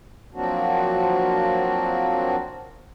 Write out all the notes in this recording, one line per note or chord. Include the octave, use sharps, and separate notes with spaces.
F3 F#3 A#3 C4 D4 F#4